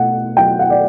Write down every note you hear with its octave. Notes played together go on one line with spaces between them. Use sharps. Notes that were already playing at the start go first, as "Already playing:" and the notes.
Already playing: B2 A3 F#5
F#3 G5
F#5
D5